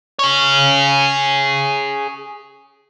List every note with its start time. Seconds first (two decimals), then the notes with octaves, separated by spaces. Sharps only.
0.19 G#4 C#5